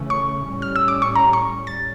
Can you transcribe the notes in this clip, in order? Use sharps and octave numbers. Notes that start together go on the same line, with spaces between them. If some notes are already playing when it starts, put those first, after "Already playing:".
Already playing: C#3 E3 A3 C#4
C#6
A2 G3 C#4
F6
E6
D6
C#6
A#5
C#6
A6